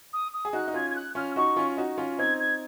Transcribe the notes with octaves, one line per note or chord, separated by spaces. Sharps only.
D#6
D#6
G#4
D#4 F#4 F#6
D#4
C#4 F4 G#6
G#6
F#6
C#4 F4 F6
D#4 F#4 C#6
C#4 F4
D#4 F#4
C#4 F4
C4 D#4 G#6
G#6